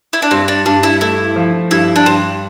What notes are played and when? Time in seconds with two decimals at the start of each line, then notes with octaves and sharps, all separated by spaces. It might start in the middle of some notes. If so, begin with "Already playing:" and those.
0.13 E4
0.22 D4
0.31 G2 C4
0.48 D4
0.66 G2 D4
0.83 E4
1.01 A3 E4
1.36 F3
1.71 G2 E4
1.96 D4
2.06 G2 C4